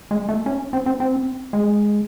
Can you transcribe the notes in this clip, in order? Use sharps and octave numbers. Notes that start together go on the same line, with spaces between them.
G#3
A3
C#4
C4
C4
C4
G#3